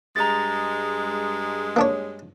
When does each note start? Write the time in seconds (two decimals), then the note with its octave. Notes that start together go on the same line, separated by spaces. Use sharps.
0.16 G2 G#3 A#5 A6
1.76 A#3 D4 C#5